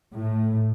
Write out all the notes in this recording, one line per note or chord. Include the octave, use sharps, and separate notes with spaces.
A2